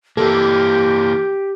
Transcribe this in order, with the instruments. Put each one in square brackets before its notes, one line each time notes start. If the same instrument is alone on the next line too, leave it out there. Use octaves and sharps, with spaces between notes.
[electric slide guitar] E3 A#3 [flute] G4 [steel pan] A4